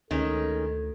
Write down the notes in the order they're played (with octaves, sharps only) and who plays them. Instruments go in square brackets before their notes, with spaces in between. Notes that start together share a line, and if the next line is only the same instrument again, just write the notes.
[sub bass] D2 [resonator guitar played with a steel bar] D#3 G#3 C#4 [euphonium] A4